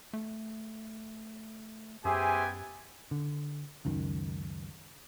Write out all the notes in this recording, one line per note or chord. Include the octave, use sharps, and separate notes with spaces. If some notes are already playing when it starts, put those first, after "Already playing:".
A3
F#2 B3 G4 G#4 C5 E5 G#5
D3
C#2 F#2 D#3